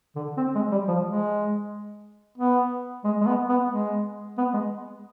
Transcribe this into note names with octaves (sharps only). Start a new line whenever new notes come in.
D3
C4
G#3
G3
F3
G#3
B3
G#3
G#3
B3
B3
G#3
B3
G#3